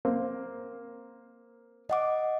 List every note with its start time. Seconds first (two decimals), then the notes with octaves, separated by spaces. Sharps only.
0.05 A#3 C4
1.90 D#5 F#5 D6